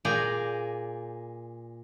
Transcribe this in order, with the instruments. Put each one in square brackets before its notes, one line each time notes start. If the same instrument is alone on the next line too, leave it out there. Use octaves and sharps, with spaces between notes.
[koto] A#2 G#4 D5 G5 A#5